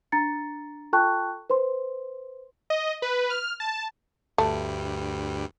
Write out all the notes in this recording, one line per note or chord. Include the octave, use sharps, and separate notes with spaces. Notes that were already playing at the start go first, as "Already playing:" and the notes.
D4 A#5 A6 C#7
F4 A4 G5 A5 C#6 F#6
B4 C5 C6
D#5
B4
F6
A5
D2 G2 G3 A3